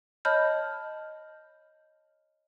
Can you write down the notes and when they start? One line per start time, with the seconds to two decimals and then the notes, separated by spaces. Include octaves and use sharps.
0.25 C#5 D#5 A5 B5 F6 G6